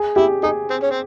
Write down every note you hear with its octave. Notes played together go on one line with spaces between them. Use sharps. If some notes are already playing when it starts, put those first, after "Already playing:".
Already playing: G#4
E4 G4
D#4 G#4
C4
C#4
C4